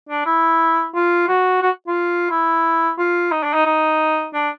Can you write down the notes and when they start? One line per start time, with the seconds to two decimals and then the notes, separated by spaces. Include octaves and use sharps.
0.09 D4
0.26 E4
0.95 F4
1.28 F#4
1.62 F#4
1.88 F4
2.30 E4
2.98 F4
3.32 D#4
3.43 D4
3.54 D#4
3.66 D#4
4.34 D4